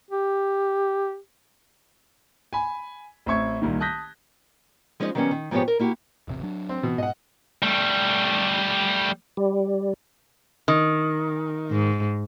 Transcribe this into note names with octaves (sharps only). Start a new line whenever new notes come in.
G4
G#5 B5
A1 C4 E5 C#6 G#6
C2 A#2 D#3
A5 D#6 F#6 G6 A#6 B6
F3 G#3 C#4 D#4 C5 D#5
D#3 F#3 G3 B3 C#4
D#3
G#2 F3 G#3 B3 G4 C#5
A#4
A#3 E4 F#4 G4
E1 A1 C3
F#3 D4
C4
B2 E3
G#2 D#5 F#5
G3 A3
G3
D#3
G#2